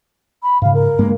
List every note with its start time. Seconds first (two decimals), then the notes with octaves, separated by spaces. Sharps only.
0.42 B5
0.62 G#2 C#3 F5
0.74 A#4
0.99 G2 G#3 A#3